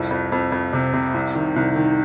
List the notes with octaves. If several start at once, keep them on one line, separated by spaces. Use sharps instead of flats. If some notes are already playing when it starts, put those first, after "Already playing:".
Already playing: C2 F2
F2
F2
F2
C3
C3
C2
D#3
C2
D#3